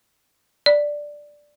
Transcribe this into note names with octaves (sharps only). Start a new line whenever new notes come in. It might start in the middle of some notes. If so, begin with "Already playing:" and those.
D5